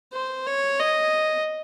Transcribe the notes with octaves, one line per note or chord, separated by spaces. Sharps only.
C5
C#5
D#5